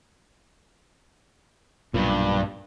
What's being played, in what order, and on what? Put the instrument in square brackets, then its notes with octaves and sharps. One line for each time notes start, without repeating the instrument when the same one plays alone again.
[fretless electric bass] B1 A#2 [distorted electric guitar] G2